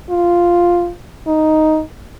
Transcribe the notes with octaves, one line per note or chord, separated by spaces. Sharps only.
F4
D#4